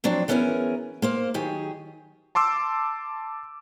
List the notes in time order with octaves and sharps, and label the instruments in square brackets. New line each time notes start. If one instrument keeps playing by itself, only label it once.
[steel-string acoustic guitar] F3 F#3 C4 D4
E3 B3 C#4 G#4 A#4 G#5
A#3 C5 F5
D#3 F#3 G4 G#4
[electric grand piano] A5 C6 D6 E6